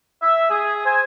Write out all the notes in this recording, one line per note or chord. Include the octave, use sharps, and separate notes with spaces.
E5
G#4
C5 G#5